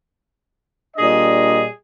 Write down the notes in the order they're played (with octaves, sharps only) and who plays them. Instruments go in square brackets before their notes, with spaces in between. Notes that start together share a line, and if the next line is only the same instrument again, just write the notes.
[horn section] A#2 G3 D4 G#4 D#5